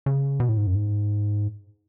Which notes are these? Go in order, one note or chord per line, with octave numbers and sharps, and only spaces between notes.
C#3
B2
A2
G#2
F#2
G#2